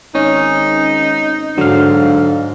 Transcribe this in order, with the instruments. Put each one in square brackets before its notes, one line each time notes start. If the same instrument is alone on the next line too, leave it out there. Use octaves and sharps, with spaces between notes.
[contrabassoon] G#1 [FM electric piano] C#4 [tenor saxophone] D#4
[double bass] G#2 [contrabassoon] D3 [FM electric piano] F#3 F5